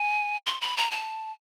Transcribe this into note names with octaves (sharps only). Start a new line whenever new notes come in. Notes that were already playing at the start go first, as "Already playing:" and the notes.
Already playing: G#5
C6
B5
A#5
A5